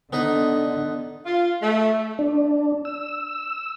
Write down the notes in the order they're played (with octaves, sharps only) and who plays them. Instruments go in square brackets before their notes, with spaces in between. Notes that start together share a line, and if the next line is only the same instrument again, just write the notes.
[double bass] D3 [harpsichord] B3 D#4 B4
[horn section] F4
A3
[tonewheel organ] D4
E6